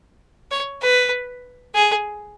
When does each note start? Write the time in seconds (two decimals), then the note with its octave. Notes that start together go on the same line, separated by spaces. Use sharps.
0.51 C#5
0.82 B4
1.74 G#4